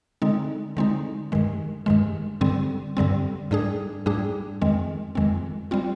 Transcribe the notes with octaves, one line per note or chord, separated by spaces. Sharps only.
D3 G#3 C4 D#4
D3 G#3 C4 D#4
G2 D#3 G#3
G2 D#3 G#3
G2 D3 G3 C4
G2 D3 G3 C4
G#2 G3 D4 G#4
G#2 G3 D4 G#4
F2 D#3 G#3 C4
F2 D#3 G#3 C4
G3 C4 F4